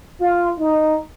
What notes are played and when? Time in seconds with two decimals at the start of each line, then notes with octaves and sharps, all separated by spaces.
0.20 F4
0.58 D#4